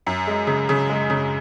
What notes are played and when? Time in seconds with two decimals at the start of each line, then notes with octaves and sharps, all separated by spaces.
0.07 F#2
0.27 G#3
0.47 C#3
0.69 C#3
0.90 G#3
1.10 C#3